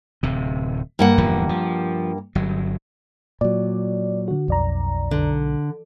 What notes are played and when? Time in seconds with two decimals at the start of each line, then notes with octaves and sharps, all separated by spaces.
0.23 D1 C3
0.99 G2 A#3 F#5
1.18 D1 E2 F3
1.49 F3
2.35 G1 F#3
3.41 A#2 F#3 D5
4.28 D3 F#4
4.48 B1 F2 D5 A#5
5.11 D3